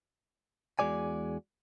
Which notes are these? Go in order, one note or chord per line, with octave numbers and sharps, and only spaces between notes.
E2 D#3 G#3 F#4 D5 G#5